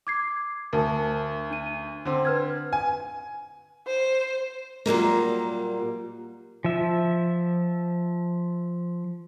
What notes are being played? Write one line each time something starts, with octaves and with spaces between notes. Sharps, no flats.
D6 G#6 C7
D2 A#4 A5
D4 D#7
D3 C4
B4 F6 G#6
G#5
C5
A#2 F#3 G3 A#3
F3 E5